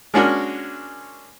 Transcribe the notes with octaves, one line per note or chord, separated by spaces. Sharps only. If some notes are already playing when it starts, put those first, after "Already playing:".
G#3 A#3 C#4 D4 F#4 A#4